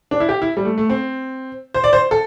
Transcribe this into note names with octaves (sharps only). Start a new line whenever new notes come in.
D4
E4
G4
E4
G3
A3
A3
C4
C5
D5
C5
A4